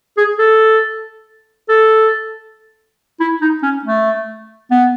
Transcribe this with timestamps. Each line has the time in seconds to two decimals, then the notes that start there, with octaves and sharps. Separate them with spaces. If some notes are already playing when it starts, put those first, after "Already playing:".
0.17 G#4
0.39 A4
1.69 A4
3.20 E4
3.41 D#4
3.63 C#4
3.85 A3
4.71 B3